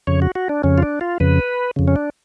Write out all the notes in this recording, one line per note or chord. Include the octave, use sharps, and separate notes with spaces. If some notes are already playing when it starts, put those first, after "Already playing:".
F2 C#3 C#5
F#4
F#4
D4
F2 C#3 C#4
F4
D4
F4
F2 C#3 B4
F2 C#3
C#4
D4